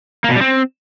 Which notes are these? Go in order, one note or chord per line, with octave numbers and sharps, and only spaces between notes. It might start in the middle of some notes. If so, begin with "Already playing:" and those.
A#3
B2
G3
C4